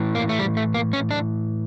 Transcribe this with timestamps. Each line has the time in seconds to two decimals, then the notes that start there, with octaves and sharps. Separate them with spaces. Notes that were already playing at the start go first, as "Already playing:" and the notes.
Already playing: A2 E3
0.15 A#3
0.29 A3
0.39 G3
0.57 A3
0.74 A#3
0.93 C#4
1.11 D4